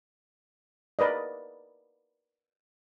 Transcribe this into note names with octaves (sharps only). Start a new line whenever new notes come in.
A#4 B4 D5 D#5